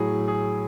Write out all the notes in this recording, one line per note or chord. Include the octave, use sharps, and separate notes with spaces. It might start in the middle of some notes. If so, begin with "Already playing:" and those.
Already playing: A2 F#3 G#4
G#4